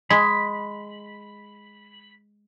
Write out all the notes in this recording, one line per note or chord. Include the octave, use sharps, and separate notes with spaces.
G#3 B5